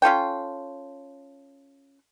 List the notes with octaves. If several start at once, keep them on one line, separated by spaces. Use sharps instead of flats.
C#4 F4 A4 G5